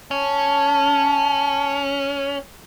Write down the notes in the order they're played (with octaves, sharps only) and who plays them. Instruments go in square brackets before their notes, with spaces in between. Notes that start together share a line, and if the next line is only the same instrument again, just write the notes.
[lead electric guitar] C#4 [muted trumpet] A5